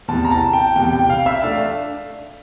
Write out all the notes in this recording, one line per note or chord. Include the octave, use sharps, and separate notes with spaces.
E2 C3 E3 A5
A#5
A5
G5
E2 C3 E3 G5
G5
F5
E5
A3 D4 F5